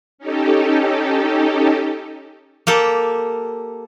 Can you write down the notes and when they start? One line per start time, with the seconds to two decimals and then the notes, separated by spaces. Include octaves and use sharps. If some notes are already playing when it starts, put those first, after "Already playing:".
0.18 C#4 D#4 G4 A4
2.67 A#3 G4 A4